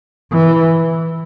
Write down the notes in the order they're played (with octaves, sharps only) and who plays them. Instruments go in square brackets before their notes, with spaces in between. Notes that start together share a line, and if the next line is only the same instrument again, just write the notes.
[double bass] E3